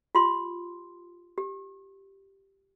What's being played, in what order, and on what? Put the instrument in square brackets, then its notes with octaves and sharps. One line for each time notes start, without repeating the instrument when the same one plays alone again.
[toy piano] F4 G4 C6
G4